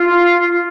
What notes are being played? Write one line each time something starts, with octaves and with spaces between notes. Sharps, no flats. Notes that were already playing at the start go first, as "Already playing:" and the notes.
Already playing: F4